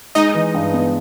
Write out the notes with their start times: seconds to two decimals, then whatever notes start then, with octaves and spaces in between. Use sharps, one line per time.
0.15 G#3 D#4 D#5
0.35 E3
0.54 G2
0.73 B3